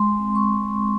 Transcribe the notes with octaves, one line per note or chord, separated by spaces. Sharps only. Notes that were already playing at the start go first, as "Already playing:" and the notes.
Already playing: G#3 C6
C4
C#6